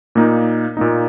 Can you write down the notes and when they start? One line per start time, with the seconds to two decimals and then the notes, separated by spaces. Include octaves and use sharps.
0.15 A#2 A#3 D#4
0.77 A#2 A#3 D#4